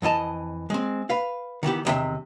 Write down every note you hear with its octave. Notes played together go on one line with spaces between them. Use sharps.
F2 E3 D#5 A5 A#5
G#3 C4
B4 F5
D#3 E3 B3 G4
B1 E2 C3 D#3 E5